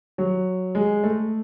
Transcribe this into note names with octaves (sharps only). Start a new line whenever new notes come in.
F#3
G#3
A3